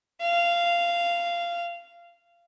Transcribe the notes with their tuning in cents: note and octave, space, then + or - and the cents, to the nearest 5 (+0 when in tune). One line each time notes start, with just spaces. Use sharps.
F5 -15